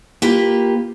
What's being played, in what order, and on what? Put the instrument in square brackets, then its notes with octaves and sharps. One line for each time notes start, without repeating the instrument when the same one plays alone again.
[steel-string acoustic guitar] A#3 F4 G4 B4